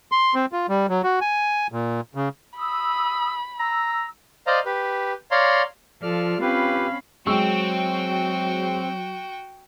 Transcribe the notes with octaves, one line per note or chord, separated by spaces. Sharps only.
C6
C4
F4
G3
F#3
F#4
G#5
A#2
C#3
B5 D#6 E6
A#5 E6
C5 D5 D#5 F5 A#5
G4 B4
C#5 D5 F5 A#5 C6
F3 F4 A4 D5 F6
C4 C#4 G4 B4 F5 B5
F#3 G#3 C4 F#4 G5 C#6 E6